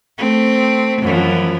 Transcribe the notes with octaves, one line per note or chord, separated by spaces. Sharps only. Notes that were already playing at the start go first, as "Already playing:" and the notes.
A3 C4
F#2 E3 F3